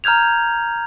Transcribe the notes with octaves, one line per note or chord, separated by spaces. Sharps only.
A#5 F6 G6 G#6 F7